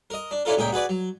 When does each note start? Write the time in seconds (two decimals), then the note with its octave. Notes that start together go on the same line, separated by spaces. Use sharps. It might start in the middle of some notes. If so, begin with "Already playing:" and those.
0.10 A#4 D#5
0.31 D4
0.45 C#4 D4 E4 F4 A4 A#4
0.57 C#2 A#2 G#4 A#4 G5
0.72 F#4 G#4 B4 D5
0.89 F#3